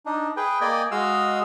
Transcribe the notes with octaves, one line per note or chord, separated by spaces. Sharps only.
D4 D#4
G#4 B4 G5
A#3 D5 D#5 G5 G#5
G#3 F#4 D#5 F5 E6